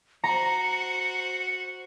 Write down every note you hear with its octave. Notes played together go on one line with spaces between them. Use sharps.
F#4 C5 A#5 C#7